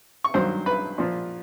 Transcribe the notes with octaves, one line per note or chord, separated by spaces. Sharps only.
C#6
G2 D#3 F#3 C5 C6
B4 B5
A#2 F3